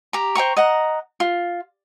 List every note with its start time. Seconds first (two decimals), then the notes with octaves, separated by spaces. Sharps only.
0.13 G4 A#5
0.35 C5 G5 A#5 C#6
0.57 D#5 F#5 A#5
1.20 F4